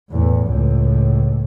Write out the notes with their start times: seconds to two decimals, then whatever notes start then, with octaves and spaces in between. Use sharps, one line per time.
0.11 E2 A2
0.47 C#2 A2